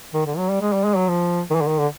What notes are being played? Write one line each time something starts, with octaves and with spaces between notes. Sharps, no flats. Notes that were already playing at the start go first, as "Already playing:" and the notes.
D#3
D3
F#3
G3
G#3
G3
G#3
F#3
F3
D#3
E3
D3
D#3
D3